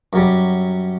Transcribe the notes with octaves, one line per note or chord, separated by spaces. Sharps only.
F#2 F#3 G3